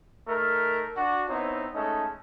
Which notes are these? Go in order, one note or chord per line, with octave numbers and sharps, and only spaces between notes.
A3 D#4 A#4
D4 F#4
B3 C4 D#4 E4 C#5
G#3 A3 C#4 D#4 A4